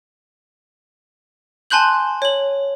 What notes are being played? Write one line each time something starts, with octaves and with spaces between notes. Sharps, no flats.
G#5 A5 C6 F#6 G6 F#7
C#5 F#7